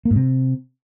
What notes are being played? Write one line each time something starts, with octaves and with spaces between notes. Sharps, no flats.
A#3
G#2
C3